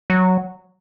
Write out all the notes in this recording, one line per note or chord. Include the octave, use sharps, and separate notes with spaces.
F#3